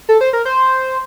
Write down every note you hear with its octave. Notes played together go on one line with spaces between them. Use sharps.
A4
C5
A#4
C5